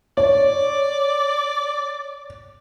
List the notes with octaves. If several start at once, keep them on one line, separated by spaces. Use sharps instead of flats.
C#5 D5